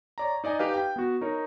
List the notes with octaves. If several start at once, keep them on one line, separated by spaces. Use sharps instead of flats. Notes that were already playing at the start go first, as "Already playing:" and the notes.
C#5 D5 A#5
D#4 D5 D#5 G#5
D#4 G4 B4 F5
G5
B3 F#4
D#4 A#4 C#5